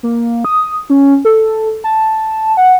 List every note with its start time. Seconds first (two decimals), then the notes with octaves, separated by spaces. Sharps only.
0.03 A#3
0.45 D#6
0.90 C#4
1.25 A4
1.84 A5
2.57 F#5